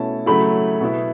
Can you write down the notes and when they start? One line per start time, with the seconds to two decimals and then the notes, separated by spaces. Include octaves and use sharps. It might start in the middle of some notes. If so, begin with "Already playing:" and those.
Already playing: B2 A3 C#4 E4 A5
0.26 C#3 F#3 A3 E4 B5
0.81 B2 B3 E4